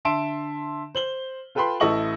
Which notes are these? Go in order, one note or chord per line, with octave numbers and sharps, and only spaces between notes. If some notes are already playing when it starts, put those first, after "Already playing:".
D3 E5 A5 C6 D7 E7
C5 F#7 G7
F4 A4 B4 G5 B5 C6
A1 E4 A4 D#5 C#6 F#7